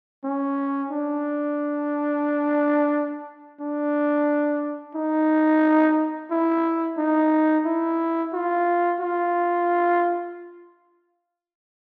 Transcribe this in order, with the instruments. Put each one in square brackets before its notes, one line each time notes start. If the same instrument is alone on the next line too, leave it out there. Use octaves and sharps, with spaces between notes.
[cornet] C#4
D4
D4
D#4
E4
D#4
E4
F4
F4